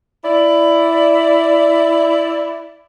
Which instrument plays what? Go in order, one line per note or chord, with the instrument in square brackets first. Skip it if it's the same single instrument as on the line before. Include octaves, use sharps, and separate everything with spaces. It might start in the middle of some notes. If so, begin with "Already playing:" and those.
[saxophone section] E4 D5